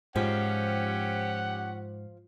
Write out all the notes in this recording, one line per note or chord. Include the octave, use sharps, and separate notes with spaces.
G#2 F3 C#4 G4 F#5